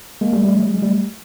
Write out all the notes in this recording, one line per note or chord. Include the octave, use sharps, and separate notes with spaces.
G#3 A#3
G3 A3
G3 A3
F#3 G#3
F#3 G#3
G3 A3